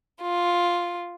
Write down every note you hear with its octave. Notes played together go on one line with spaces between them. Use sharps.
F4